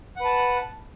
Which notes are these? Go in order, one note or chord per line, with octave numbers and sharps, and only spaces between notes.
B4 F#5 A5